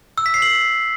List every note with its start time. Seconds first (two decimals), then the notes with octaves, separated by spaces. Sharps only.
0.18 E6
0.26 B6
0.34 C7
0.42 F#7